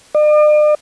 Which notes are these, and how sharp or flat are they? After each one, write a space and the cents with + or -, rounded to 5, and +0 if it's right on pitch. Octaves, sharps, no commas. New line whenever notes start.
D5 +45